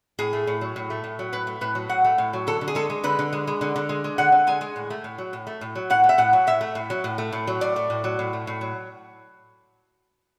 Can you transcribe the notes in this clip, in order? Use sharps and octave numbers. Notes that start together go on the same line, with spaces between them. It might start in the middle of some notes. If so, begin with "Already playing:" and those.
A2 G#4
A3
A2
F#3
A2
A3
A2
F#3
A2 B4
A3
A2 B4
F#3
A2 F#5
A3
A2
F#3
D3 A4
D3
G#4
G#3 A4
G#3
D3 B4
D3
G#3
G#3
D3
D3
G#3
G#3
D3 F#5
D3
G#3 G#5
G#3
A2
A3
A2
F#3
A2
A3
A2
F#3
A2 F#5
A3
E5
A2 F#5
F#3
A2 E5
A3
A2
F#3
A2
A3
A2
F#3
A2 D5
A3
A2
F#3
A2
A3
A2
F#3